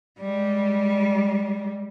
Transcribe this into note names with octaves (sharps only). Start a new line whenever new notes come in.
G3 G#3